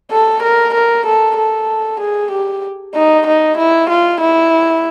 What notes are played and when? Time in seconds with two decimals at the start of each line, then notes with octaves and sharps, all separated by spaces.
0.12 A4
0.43 A#4
0.74 A#4
1.06 A4
1.37 A4
2.00 G#4
2.32 G4
2.95 D#4
3.27 D#4
3.58 E4
3.90 F4
4.21 E4